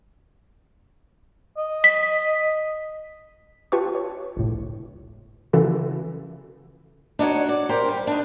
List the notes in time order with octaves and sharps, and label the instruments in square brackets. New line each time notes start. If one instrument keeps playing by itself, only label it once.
[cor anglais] D#5
[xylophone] B6
[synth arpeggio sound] F4 G4 B4 A5 C#6
C#5
G1 C#2 A2
C#3 E3 F4 F#4 A4 B4
[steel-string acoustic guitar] D4 D#4 F#4 C#5
D5
G4 A#4 C5
G3
D4 D#4